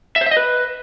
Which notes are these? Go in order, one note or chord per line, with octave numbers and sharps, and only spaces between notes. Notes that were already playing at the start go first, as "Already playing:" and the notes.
E5
C5
E5
D#5
B4